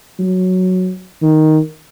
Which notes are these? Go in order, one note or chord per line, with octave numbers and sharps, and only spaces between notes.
F#3
D#3